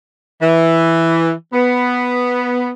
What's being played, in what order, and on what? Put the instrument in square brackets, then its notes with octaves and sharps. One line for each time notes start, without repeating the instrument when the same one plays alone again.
[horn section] E3
B3